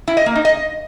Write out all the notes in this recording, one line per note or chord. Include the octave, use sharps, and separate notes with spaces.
E4
D#5
A#3
D#4
D#5